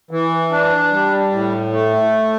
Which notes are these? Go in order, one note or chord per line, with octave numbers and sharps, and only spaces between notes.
E3
D4
G3
A2
A3